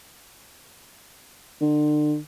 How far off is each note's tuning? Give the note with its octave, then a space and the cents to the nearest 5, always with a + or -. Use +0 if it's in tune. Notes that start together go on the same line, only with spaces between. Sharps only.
D3 +35